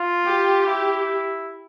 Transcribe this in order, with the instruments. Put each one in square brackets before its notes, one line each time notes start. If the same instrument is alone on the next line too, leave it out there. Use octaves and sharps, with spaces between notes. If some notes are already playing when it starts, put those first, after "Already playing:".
Already playing: [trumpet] F4
[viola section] G4
[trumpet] E4